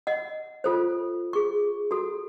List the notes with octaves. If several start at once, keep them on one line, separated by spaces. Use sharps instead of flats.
D#5 F#5
F4 A4 C5
G#4 C#6
F#4 A4